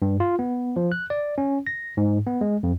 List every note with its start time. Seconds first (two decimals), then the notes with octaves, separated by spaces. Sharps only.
0.02 G2
0.20 F4
0.39 B3
0.76 F3
0.92 F#6
1.10 D5
1.38 C#4
1.67 A#6
1.97 G#2
2.27 B3
2.41 G#3
2.63 F2